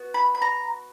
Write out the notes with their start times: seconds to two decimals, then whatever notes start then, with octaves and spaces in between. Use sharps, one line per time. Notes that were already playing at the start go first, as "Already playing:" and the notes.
Already playing: B3 F#4
0.14 B5
0.35 B5
0.42 A#5